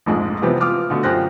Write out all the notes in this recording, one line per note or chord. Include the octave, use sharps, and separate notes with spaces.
A#1 F2 G#2 G#3
C3 E3 F3 G3 B3 C4
F4 D6 D#6 F6
B2 D3 A3
F#2 F4 G4 C5 F#6 A#6